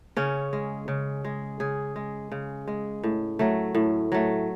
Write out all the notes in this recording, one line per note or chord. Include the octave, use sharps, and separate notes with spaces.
C#3 C#4
G#3
C#3
G#3
C#3 G#4
G#3
C#3
G#3
A2
F#3 A3
A2
F#3 A3